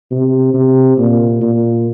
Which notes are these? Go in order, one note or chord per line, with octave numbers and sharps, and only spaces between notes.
C3
C3
A#2
A#2